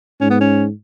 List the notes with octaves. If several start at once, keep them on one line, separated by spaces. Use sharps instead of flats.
G#2 C#4
B3
C#4